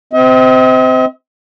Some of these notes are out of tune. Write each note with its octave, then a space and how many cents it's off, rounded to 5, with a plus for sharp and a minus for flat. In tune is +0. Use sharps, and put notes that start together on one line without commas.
C4 -20 D#5 +40